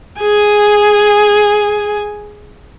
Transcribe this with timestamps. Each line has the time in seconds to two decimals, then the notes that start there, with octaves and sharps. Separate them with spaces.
0.21 G#4 G#5